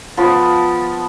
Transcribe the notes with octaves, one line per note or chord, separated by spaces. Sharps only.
F3 B3